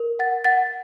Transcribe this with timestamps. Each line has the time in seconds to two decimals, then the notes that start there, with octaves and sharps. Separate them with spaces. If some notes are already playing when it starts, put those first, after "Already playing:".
Already playing: A#4
0.19 F#5 A6
0.44 F#5 A6